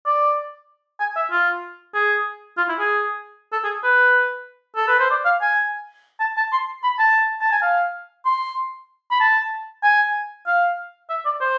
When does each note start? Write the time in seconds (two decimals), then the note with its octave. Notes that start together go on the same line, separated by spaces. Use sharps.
0.06 D5
1.00 G#5
1.16 E5
1.31 F4
1.94 G#4
2.57 F4
2.69 E4
2.79 G#4
3.52 A4
3.64 G#4
3.83 B4
4.76 A4
4.88 B4
4.99 C5
5.11 D5
5.25 F5
5.42 G#5
6.20 A5
6.37 A5
6.52 C6
6.84 B5
6.99 A5
7.41 A5
7.52 G#5
7.62 F5
8.25 C6
9.11 B5
9.20 A5
9.83 G#5
10.46 F5
11.09 E5
11.25 D5
11.41 C5